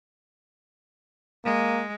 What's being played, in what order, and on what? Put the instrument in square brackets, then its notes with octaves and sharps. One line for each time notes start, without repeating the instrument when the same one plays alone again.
[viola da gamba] G#3 [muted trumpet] A#3